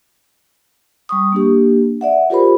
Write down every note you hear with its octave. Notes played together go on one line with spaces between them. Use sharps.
G3 C#6 D#6
A#3 D4 G4
D5 E5 F#5
F4 G4 A#4 C5 B5